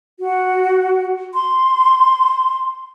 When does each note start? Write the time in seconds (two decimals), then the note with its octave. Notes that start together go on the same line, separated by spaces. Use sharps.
0.20 F#4
1.34 C6